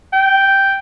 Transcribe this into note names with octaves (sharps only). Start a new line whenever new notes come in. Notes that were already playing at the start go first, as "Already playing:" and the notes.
G5